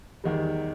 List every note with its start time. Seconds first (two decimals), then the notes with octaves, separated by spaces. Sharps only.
0.24 E2 D#3 G3